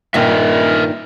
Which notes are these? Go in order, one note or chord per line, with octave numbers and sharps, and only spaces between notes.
G2 A#2 D#3 A#4 D#5 E5